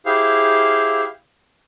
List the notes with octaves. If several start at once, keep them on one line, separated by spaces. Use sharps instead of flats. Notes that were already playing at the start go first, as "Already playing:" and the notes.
E4 G4 G#4 C5 F5